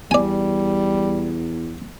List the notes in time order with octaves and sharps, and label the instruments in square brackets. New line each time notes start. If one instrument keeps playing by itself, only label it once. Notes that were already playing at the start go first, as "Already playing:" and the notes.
[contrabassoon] E2 [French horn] G3 [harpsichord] D5 G#5